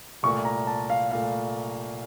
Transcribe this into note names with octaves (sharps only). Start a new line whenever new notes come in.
C2 A#2 A3 C#6
A#5
A5
F5
A#2 A3 F5